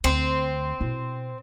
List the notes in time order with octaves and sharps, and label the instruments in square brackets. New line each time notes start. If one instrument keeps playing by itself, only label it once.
[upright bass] D2 [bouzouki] C4
[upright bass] B2 E4